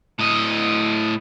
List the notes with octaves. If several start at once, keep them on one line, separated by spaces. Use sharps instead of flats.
A2 D#5